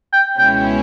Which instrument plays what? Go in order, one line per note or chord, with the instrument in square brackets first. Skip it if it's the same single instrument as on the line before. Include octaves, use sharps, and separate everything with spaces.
[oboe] G5
[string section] C#2 B2 G#3 C#4 E4 [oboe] G5